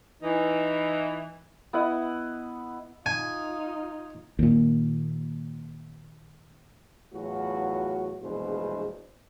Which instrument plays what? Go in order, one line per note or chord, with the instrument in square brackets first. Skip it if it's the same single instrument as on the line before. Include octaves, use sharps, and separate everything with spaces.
[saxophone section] E3 [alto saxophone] D#4
[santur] B3 E4 D#5 F#5
[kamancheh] D#4 F4 [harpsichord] G#5
[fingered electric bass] D#2 A#2
[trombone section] E2 A2 F#3 F4 F#4
A#1 E2 G2 B2 G#3 C5